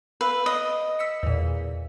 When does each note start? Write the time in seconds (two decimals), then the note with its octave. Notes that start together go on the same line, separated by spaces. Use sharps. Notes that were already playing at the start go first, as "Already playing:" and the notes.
0.21 B4 F5 E6
0.46 D#5
0.99 E6 B6 C#7
1.23 E2 A#2